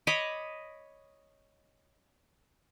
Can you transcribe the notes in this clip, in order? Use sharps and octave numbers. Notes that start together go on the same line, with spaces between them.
C#5 D#5 B5 D6